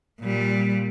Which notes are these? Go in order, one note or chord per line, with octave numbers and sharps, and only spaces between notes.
A#2 G3